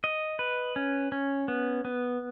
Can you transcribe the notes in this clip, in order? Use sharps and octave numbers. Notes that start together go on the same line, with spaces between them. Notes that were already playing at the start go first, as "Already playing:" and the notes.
D#5
B4
C#4
C#4
B3
B3